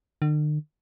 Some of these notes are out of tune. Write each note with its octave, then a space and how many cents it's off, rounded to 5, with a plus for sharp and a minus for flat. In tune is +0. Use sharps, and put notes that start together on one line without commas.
D3 +45